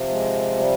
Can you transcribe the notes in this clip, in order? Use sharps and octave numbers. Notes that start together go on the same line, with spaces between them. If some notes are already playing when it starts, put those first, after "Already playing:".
Already playing: C3 F3
G#3
G3